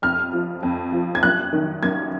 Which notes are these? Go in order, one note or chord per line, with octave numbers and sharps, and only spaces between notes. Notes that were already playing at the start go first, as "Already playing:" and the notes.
F2 F6
F3
F2
F3
G#6
F#2 F#6
D#3
F#2 G#6